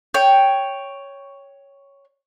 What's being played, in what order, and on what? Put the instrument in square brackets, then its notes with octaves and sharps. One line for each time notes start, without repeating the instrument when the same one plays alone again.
[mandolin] C#5 G5